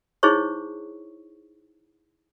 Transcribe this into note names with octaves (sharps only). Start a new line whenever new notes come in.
D#4 E4 G#4 C5 C#5 C#6